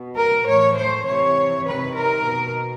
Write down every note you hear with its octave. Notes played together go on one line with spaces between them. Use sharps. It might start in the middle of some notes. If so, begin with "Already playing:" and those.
Already playing: B2
A#4
A2 E3 C#5
C5
C3 E3 C#5
C3 D#3 B4
A#4
B2